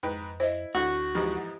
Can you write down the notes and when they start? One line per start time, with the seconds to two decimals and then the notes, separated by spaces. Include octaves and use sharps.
0.03 F2 G#2 B4 G5
0.40 E4 C5 D#5
0.75 D2 A2 D3 F#4
1.15 F2 G#2 E3 G4